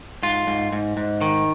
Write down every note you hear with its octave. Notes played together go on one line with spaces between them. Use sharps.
G#2 F4
G#2
G#2
G#2
D#3